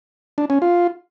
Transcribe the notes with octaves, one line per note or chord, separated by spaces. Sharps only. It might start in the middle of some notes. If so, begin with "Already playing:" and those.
D4
C#4
F4